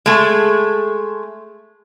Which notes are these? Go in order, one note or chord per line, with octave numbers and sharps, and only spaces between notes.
G#3 A3